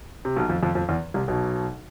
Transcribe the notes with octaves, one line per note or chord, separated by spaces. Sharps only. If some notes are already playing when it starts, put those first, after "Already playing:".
C3
B1 B2
F2 F3
F2 F3
F2 F3
E2 E3
C2 C3
B1 B2